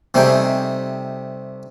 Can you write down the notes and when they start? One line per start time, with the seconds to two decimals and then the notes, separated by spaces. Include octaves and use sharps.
0.14 C3 G3 A3 D#4 G#4 G5